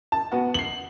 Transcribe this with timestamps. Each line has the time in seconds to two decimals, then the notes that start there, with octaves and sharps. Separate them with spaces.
0.12 A5
0.32 B3 F#4
0.54 C7 F#7